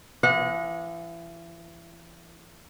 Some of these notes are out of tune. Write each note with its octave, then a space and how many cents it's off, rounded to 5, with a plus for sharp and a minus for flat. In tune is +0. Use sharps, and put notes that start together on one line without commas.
E3 +35 D#5 +15 F#5 -30